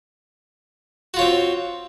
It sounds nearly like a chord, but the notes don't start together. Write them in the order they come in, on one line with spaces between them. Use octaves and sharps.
F#4 F4 C#5 C4